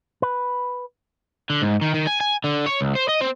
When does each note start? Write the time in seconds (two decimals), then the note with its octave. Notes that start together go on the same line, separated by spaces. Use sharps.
0.22 B4
1.50 D3
1.62 G#2
1.81 D#3
1.94 D#3
2.07 G#5
2.21 G#5
2.44 D3
2.66 C#5
2.81 C#2
2.95 C5
3.09 D#5
3.21 C4